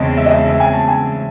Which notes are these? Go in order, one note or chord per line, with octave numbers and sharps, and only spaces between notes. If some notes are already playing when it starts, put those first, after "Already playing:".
Already playing: E2 C#3 G#3 C4 D#5 A5
E5
D#5
E5
E5
G#5
A5
G#5